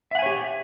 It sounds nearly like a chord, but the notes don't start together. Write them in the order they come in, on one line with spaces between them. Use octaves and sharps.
E5 F#5 G#5 C#5 G4